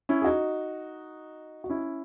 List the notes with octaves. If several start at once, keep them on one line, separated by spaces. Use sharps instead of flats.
C#4 E4
G#4
D#4 F#4
F#4
C#4 E4